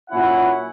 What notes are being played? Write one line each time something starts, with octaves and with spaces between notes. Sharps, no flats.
A#2 F#3 C#4 E4 F#5